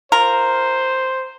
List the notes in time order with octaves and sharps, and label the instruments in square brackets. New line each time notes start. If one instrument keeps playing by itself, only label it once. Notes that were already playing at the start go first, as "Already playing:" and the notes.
[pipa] F4 A#4 [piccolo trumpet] C5